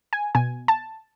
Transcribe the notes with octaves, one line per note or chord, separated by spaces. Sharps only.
G#5
B2 G#5
A5